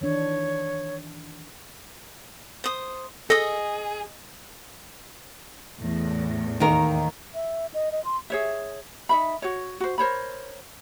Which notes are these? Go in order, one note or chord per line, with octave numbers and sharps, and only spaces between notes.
D#3 E3 D4 C#5
C5 D#6
G#4 A4 D#5 D#6
E2 A2
D#2 D#3 A#4
E5
D#5
D#5
C6
G#4 C#5 E5
D#4 E5 B5
F#4 C#5
F#4 C5
A#4 C5 C#5 B5